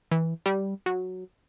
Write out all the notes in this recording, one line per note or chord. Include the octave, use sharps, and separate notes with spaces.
E3
G3
F#3